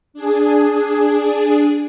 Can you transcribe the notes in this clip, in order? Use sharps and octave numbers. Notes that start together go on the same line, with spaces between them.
D4 G#4